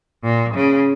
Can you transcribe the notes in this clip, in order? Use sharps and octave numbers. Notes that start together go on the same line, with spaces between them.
A#2
C#3